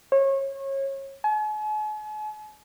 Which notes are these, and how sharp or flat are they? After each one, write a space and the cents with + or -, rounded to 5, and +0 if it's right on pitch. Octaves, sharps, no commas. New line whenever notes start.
C#5 -30
G#5 +45